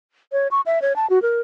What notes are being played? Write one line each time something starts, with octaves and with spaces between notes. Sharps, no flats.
C#5
C#6
E5
C#5
A5
F#4
A#4